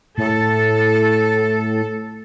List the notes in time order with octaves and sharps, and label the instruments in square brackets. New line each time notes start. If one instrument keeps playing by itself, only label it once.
[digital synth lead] A2 [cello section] A4